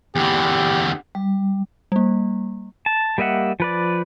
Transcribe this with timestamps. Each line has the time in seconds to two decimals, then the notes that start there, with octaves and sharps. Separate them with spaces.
0.16 E2 D3 G4
1.15 G3
1.92 G3 A#3
2.86 A5
3.18 G3 A#3 D#5 E5 F#5
3.60 F3 B4 D5